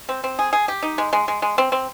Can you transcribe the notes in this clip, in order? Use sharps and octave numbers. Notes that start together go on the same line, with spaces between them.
C4
C4
G#4
G#4
G4
D#4
G#3
G#3
G#3
G#3
C4
C4